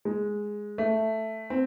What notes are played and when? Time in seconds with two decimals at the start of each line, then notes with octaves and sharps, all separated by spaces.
0.05 G#3
0.78 A3
1.50 C4